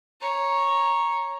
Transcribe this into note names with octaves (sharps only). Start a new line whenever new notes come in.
C#5 A#5